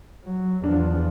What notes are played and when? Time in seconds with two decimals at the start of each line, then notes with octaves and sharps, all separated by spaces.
0.25 F#3
0.64 E2 F3 D4